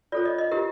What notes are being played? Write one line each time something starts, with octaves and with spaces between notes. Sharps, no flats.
F4 A4 C#5 D5
D#5
D#5
E4 G4 A#4